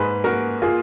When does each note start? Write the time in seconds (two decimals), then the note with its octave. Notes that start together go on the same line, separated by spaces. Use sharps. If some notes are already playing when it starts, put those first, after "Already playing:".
Already playing: G#2 A#3 G#4 B4
0.24 A#3 F#4 A#4
0.62 A#3 F4 G#4